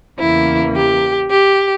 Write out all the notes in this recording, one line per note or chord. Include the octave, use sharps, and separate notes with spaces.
E2 C#3 E3 A#3 E4
G4
G4